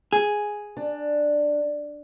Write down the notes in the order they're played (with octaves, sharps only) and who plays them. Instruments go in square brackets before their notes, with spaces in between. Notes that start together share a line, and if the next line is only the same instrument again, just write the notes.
[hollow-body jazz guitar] G#4
[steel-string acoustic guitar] D4